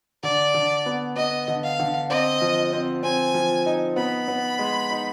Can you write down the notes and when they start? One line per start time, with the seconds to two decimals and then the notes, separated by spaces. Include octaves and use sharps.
0.23 D3 D5
0.54 D3
0.86 B3
1.16 B3 D#5
1.48 D3
1.64 F5
1.80 D3
2.10 C4 D#5
2.41 F3
2.73 C4
3.03 C4 G#5
3.34 F3
3.66 D#4
3.96 B3 B5
4.28 B3
4.59 G#3
4.90 D#4